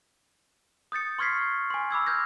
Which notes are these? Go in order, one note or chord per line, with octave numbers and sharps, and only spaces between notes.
D#6 G6 A6 C#7
C6 C#6 F6 G#6 B6 C7
G#5 C6
B5 D6 E6 G#6
F6 G6 G#6 A#6